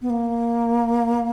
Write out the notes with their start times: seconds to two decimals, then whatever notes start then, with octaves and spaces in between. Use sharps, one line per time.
0.02 B3
0.10 A#3